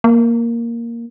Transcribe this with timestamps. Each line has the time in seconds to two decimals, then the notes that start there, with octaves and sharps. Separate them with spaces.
0.04 A#3